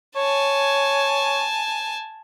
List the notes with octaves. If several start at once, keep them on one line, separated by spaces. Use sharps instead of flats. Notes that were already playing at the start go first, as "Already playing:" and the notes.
C#5 G#5 A5